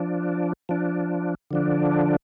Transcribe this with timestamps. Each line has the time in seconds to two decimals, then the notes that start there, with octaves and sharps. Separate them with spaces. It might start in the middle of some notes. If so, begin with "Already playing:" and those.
Already playing: F3 D4
0.69 F3 D4
1.51 D3 F3 D4